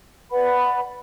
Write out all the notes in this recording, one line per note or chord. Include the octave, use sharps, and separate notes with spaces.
B4 D5 F#5 B5